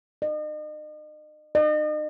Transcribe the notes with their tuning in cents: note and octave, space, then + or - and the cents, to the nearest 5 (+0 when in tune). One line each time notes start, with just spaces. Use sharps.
D#5 -40
D#5 -40